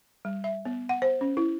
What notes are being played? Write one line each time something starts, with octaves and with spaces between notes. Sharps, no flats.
G3
E5
B3
F#5
C5
C#4
E4